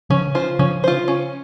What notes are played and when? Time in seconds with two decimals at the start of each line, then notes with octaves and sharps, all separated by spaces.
0.10 C#3 F3 C#4
0.35 F4 C5
0.59 C#3 F3 C#4
0.84 F4 C5
1.08 C#4